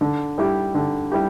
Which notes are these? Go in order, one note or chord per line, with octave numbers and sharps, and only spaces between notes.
D3
G3 E4 G4
D3
G3 E4 G4